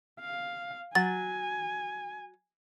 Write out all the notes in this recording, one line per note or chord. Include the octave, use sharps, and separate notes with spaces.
F5
F#3 G#5 A6